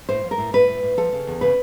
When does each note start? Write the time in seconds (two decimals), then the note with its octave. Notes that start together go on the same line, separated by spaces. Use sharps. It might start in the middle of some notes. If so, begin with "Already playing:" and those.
0.09 A2 C5
0.24 F3
0.31 A#4
0.38 A2
0.53 A2 B4
0.68 A2
0.83 A2
0.97 F3 A4
1.13 C#3
1.27 E2
1.41 C#3 B4